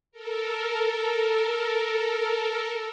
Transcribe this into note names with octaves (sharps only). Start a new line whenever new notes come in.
A4 A#4